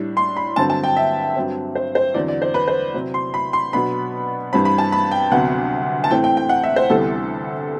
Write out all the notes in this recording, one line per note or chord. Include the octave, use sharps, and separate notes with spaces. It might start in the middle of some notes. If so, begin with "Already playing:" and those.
Already playing: A2 G3 D4
C6
B5
G2 D3 F#3 C4 A5
A5
G5
E5
G2 F#3 C4
C5
C5
E2 D3 F#3 C4 D5
D5
C5
B4
C5
C3 F#3 C4
C6
B5
C6
B2 F#3 B3 D4 B5
G2 E3 G3 C4 B5
B5
A5
B5
G5
D2 C3 F#3 B3 F#5
A5
A2 E3 A3 C4 G5
G5
G5
F#5
E5
C5
D2 C3 E3 G3 B3 A4